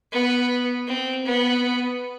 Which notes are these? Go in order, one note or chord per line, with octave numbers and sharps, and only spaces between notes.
B3
C4
B3